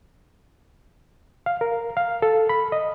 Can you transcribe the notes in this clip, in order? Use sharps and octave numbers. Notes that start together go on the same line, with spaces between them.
F5
A#4
F5
A4
B5
D#5